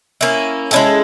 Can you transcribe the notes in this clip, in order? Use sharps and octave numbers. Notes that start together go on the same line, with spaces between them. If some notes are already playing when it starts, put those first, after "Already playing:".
A#3 C#4 E4
G#3 C#4 E4 A4